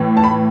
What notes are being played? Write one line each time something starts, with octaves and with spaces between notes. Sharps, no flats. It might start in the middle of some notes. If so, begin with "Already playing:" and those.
Already playing: A2 E3
A5
B5